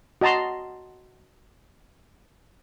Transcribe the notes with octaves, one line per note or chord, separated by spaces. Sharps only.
F#4 D#5 A5 A#5 C6